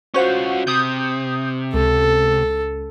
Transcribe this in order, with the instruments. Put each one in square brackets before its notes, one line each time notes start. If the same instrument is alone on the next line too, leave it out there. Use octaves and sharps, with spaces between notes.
[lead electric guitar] C#4 F4 [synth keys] F#4 C5 F#5
[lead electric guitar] C3 [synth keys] D#6 G6
[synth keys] C#2 [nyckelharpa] A4